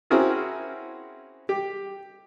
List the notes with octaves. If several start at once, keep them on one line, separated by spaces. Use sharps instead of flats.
C4 C#4 E4 F#4 G#4 A#4
G4